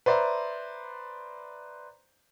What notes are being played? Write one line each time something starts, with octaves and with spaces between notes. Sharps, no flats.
B4 C5 D5 E5 A#5